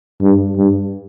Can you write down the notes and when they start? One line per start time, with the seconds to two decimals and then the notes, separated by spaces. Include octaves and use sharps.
0.21 G2
0.56 G2